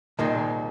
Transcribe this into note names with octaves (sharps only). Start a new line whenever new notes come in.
C2 A#2 D#3 G#3 D#4